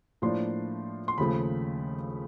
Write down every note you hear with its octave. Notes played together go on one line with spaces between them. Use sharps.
A2 F3 A#3 D4 C6
C6
D#2 C#3 F3 A3 B5